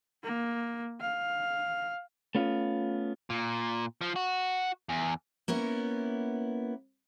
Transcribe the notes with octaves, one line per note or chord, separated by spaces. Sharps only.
A#3
F5
A3 B3 C#4 F4
A#2
F3
F#4
E2
A#3 B3 C#4 E4